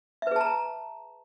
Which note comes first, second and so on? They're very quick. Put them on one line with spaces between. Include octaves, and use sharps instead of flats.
E5 B4 G#4 A5 A#5